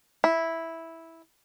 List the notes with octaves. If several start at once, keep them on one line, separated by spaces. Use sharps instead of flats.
E4